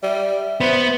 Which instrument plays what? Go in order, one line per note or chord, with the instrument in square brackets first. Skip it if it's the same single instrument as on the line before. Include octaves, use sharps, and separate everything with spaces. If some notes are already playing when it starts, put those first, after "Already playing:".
[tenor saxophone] G3 [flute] E5
[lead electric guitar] B3 [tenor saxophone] C5